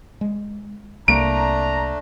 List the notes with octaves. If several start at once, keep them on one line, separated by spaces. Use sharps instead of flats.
G#3
C2 A3 A#3 D4 A#5 D7